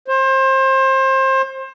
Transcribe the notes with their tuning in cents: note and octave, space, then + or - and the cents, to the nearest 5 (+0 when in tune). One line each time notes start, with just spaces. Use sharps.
C5 +30